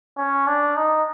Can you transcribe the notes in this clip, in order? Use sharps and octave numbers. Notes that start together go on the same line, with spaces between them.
C#4
D4
D#4